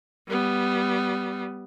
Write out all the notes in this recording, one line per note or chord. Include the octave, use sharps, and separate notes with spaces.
G3 B3